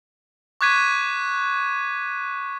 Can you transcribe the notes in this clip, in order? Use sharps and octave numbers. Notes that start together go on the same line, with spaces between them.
C#6 D6 F#6 G#6 B6 D#7